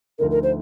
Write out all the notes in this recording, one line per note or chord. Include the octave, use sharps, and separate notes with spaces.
D2 D3 F3 A3 D#4 A#4
A#4
C5